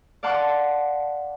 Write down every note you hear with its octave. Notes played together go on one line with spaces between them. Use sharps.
D5 F5 F#5 A5 C6 D6